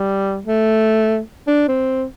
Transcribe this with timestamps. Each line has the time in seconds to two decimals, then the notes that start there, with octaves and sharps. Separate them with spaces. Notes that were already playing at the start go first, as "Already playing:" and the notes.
Already playing: G3
0.46 A3
1.47 D4
1.68 C4